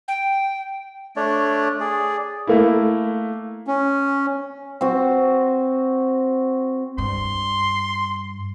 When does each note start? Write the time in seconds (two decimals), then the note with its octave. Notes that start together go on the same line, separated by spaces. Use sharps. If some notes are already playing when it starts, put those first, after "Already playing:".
0.08 G5
1.16 A3 D4 C#5 D5
1.81 G#4 D5
2.47 A3 A#3 E4
3.67 C#4
4.81 C4 F#4
6.98 G2 C6